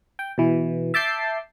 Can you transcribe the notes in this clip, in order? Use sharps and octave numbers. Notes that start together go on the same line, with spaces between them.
G5
B2 E3
E5 A5 D6 G6 C7